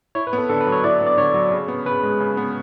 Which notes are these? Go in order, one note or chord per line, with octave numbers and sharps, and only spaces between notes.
E4 C#5
B4
B3
A4
D3 A4
B4
F#3
C#5
E4 D5
B3
D5
D3 C#5
F#3
C#3
B3
C#3 B4
G#3
C#3
B3